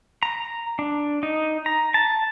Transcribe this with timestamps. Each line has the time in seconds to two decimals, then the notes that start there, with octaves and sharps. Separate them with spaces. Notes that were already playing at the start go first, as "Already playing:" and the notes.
0.23 A#5
0.79 D4
1.23 D#4
1.66 A#5
1.94 A5